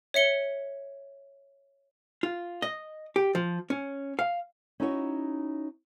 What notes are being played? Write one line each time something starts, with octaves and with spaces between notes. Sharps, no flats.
C#5 E5 C#7 G7
F4
D#5
G4
F3
C#4
F5
C#4 D#4 E4 F#4 B4 C#5